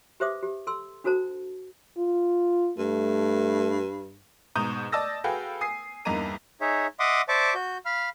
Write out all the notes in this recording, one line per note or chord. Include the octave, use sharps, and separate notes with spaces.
G4 B4 C5 E5 D6 D#6
G4
A4 C6 E6
D4 F#4 A4 C5 A5
F4
G2 A3
G#2 B2 A#5 D#6 G6 D#7
D5 D#5 A5 D#6 E6 A#6
F#4 G#4 A4 B4 F5 G5
G#5 D#6 C7
E2 G2 A#3 D#4 A#5 D#7
D#4 G#4 C#5 E5
D#5 E5 F#5 C6 D6 D#6
C5 D5 E5 A5 C#6 D6
F#4 G6
F5 B5 F6